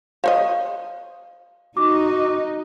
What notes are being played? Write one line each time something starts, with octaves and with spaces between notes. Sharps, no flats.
C5 C#5 D#5 F5
D#4 F#4 D6